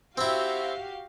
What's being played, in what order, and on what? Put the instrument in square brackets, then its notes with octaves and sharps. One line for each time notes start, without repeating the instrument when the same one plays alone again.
[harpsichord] C4 E4 [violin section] F#4 G4 F5